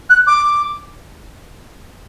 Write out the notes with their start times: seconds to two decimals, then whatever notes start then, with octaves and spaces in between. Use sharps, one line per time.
0.09 F#6
0.27 D6